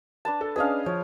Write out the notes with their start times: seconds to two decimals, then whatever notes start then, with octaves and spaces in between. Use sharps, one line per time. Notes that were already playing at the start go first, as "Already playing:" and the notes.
0.25 D4 B4 A5
0.41 A4
0.56 C#4 D4 G#4 B4 D#5 F5
0.86 F3 C#5